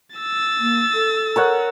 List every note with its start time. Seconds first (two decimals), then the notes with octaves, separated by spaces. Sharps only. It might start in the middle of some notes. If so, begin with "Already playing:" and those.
0.16 E6 A6
0.60 A#3
0.94 A4
1.36 A#4 C#5 F#5